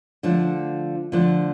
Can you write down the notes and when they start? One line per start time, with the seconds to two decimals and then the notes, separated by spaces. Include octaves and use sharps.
0.23 D3 F3 A3 D4
1.12 D3 F3 A3 D4